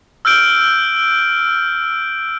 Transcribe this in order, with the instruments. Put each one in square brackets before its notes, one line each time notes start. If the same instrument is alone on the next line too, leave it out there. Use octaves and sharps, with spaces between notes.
[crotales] E6 F6 G6 D7